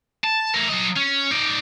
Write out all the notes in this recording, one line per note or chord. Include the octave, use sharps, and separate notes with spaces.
A5
A3 A#4
F#3 D#5
C#4
D#4 D5